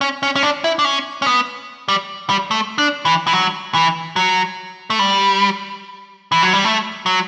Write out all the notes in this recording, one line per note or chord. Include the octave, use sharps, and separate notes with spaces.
C#4
C#4
C#4
D4
E4
D4
C#4
C#4
B3
G3
G3
A3
D4
E3
E3
F#3
E3
F#3
A3
G3
E3
F#3
G3
A3
F#3